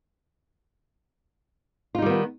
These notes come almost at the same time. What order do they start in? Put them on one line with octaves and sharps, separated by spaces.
F4 D#4 G3 D#3 B3